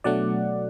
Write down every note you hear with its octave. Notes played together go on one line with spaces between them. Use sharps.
B2 F#3 A3 D4 D5 F#5